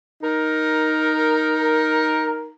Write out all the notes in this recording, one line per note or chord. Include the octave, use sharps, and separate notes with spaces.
D#4 A#4